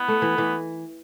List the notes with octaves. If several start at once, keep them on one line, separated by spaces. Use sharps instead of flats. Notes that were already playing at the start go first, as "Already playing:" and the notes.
Already playing: B3 E4
A3
E3
E3